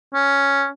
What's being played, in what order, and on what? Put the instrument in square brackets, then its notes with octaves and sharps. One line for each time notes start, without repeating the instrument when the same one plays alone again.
[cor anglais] C#4